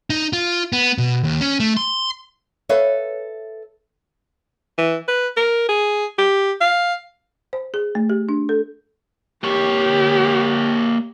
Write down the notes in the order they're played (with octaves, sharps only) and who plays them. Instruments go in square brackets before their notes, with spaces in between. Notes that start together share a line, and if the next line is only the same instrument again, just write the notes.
[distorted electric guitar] D#4
F4
B3
B2
D#2
C#4
A3
C6
[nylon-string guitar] A4 B4 C#5 E5 F5
[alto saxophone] E3
B4
A#4
G#4
G4
F5
[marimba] C5
G#4
A3
G4
D4
A4
[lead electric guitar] A#3 C#5 [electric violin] G4